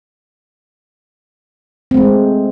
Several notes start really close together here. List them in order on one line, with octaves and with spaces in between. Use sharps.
C4 A3 G#3